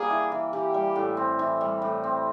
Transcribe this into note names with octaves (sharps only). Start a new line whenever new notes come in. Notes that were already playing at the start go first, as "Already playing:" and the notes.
Already playing: G3 A#3 G#4
E3
E3
E3 G4
G3
A2
C4
E3
G3
A2
C4